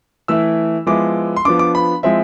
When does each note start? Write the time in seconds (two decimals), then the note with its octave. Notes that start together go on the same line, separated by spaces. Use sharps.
0.28 E3 A3 E4 E6
0.87 F3 G#3 B3 E4 D6
1.36 C6
1.45 F3 B3 D4 D6
1.59 D6
1.75 B5
2.03 F3 G#3 C4 E4 E5